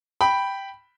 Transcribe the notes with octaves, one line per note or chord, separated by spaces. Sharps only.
G5 B5